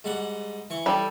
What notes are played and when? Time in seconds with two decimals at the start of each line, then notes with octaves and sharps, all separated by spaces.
0.04 G#2 G3 F#5
0.70 E3 C#6
0.86 G3 A4